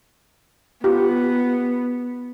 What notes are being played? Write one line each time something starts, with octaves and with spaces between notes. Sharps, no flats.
B3 F4 G4